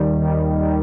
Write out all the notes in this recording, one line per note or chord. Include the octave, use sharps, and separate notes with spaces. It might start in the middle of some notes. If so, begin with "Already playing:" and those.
Already playing: D#2 D#3 G3
D#2 D#3 G3
D#2 D#3 G3